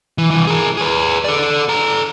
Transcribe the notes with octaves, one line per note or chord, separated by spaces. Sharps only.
E3
C2 E3
G#4 A#4
G#4 B4
A4 D5
A4 A#5